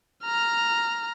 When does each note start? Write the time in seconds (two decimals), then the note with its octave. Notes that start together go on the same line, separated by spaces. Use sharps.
0.24 A#5 F6